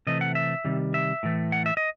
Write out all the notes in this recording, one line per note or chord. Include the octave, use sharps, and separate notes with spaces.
C3 E3 A3 D#5
F#5
E5
C3 D#3 G3
E5
A2 E3 A3
F#5
E5
D#5